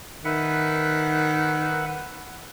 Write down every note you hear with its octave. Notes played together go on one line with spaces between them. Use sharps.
D#3 B4 E5 F#5